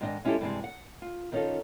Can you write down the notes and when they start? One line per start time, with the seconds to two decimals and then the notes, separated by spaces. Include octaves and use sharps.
0.01 G#2 D#3 B3 D4 D#5 G#5
0.25 G#3 C#4 E4 F4 G4 A4
0.41 G2 C3 E3 F3 G3 G#3
0.64 F#5
1.02 F4
1.32 D#3 B3 C#4 D#4 F4 A4